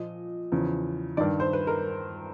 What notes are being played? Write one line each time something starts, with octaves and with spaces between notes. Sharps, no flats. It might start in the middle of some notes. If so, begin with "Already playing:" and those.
Already playing: A#2 F3 D#5
E2 C#3 F3
G2 D#3 D5
C5
B4
A#4